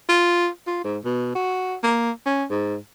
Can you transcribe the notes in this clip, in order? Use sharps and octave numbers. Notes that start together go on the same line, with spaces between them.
F4
F4
G#2
B2
F#4
A#3
C#4
G#2